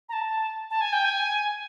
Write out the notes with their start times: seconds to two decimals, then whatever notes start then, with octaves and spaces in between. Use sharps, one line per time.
0.09 A#5
0.13 A5
0.70 A5
0.81 G#5
0.93 G5
1.05 G#5